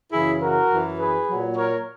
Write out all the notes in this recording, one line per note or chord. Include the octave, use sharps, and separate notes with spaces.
F#2 C#3 E3 E4 G#4
F#4 A#4
F#2 E3
G#4 B4
A#2 F#3
A#4 C#5